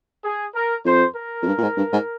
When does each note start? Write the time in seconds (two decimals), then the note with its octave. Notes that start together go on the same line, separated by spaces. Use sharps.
0.23 G#4
0.54 A#4
0.85 F2 C5
1.15 A#4
1.42 F2
1.47 G2
1.58 A#2
1.62 G#2
1.77 G2
1.93 G#2